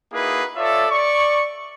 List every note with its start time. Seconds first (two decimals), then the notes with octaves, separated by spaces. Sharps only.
0.13 A#3 D#4 E4 F#4 G#4 B4
0.56 F4 A4 C#5 D5 E5
0.90 D5 C#6